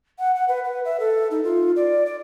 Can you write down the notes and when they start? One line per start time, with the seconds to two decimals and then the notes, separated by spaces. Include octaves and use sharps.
0.19 F#5
0.35 F#5
0.48 B4
0.64 B4
0.85 E5
1.00 A4
1.31 D#4
1.44 F4
1.76 D5
2.06 D5